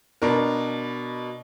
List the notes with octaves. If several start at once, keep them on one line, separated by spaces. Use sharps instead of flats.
B2 D4 A#4